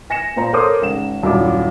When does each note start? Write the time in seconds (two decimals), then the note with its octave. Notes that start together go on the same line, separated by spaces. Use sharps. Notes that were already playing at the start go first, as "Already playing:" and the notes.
0.10 G#5 A#6 C#7 E7
0.36 A#2 C5 A#5
0.53 A4 A#4 C5 C#5 D6 D#6
0.82 G#1 C#3 E7
1.23 D#1 F#2 D4 E4 D6